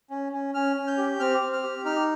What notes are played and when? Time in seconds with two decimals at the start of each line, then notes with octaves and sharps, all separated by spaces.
0.10 C#4
0.32 C#4
0.54 C#4 F6
0.76 C#4
0.87 G6
0.98 G4
1.20 C4 F6
1.42 C4
1.52 F6
1.63 G4
1.85 D#4 F6